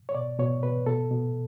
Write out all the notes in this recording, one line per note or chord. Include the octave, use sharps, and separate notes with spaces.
C#5
B2 D5
B2 C#5
B2 B4
B2 A4
B2